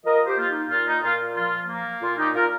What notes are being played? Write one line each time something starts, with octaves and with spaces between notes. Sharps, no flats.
F3 A#4 D#5
G4 C5
A#3 F4
D#4 G4
A#2 F4
D#4
A#2 F4
F3 F4
A#3
A#2 F4
D#4 G4
A#2 F4 A#4